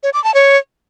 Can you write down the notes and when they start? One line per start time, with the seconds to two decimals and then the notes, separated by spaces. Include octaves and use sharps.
0.03 C#5
0.14 D6
0.24 A5
0.34 C#5